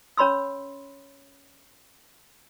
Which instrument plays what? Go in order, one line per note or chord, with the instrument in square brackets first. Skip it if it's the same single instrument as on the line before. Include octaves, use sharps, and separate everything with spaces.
[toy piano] C#4 C#5 B5 C6 E6